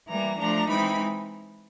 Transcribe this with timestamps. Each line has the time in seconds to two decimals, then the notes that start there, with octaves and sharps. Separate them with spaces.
0.09 E3 G3 A#3 A#5
0.39 F3 A3 D4 A#5
0.69 E3 G#3 C4 D#4 B5